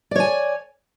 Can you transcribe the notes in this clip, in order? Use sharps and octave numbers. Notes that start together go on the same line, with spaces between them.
C#5 D5 G#5